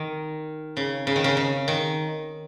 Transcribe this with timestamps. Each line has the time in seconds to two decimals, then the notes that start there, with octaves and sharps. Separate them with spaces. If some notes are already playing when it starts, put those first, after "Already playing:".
Already playing: D#3
0.77 C#3
1.07 C#3
1.16 D#3
1.24 C#3
1.37 C#3
1.68 D#3